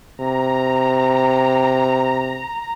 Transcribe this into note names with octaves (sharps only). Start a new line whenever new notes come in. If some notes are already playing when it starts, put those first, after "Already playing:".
C3 A#5